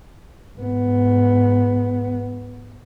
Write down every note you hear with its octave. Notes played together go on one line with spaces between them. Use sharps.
G#2 B3